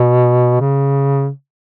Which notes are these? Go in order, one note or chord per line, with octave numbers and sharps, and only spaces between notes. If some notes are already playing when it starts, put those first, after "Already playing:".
Already playing: B2
C#3